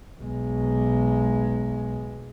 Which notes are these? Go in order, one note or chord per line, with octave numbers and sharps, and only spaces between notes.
B1 G#3